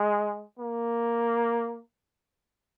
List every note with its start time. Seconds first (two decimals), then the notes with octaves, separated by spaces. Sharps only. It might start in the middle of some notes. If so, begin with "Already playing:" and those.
Already playing: G#3
0.59 A#3